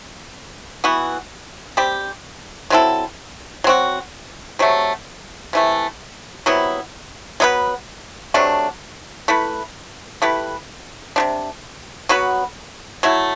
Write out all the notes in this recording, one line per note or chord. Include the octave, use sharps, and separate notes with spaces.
E3 B3 F#4
G3 C4 G4
F#3 C4 E4 A4
F#3 C4 F#4
C3 F#3 A3
C3 E3 A3
C3 F#3 B3 E4
F#3 B3 E4 B4
C3 F#3 A3 D4
A3 E4 B4
A3 E4 G4 B4
C3 G3 D4
F#3 B3 F#4 B4
F#3 A3 E4